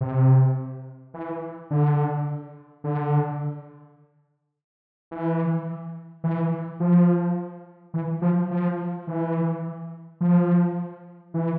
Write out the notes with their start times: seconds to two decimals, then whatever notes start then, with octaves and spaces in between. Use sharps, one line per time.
0.01 C3
1.14 E3
1.71 D3
2.84 D3
5.11 E3
6.24 E3
6.80 F3
7.94 E3
8.22 F3
8.51 F3
9.07 E3
10.21 F3
11.34 E3